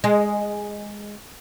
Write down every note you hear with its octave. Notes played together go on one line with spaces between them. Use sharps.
G#3